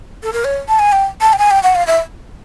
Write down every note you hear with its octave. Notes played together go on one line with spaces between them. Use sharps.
A4
A#4
C#5
A5
G#5
G5
A5
G5
G#5
G5
F#5
F5
E5